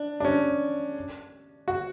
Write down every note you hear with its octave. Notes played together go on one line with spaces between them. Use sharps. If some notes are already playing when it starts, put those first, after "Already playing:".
Already playing: D4
D4
C#4
F#4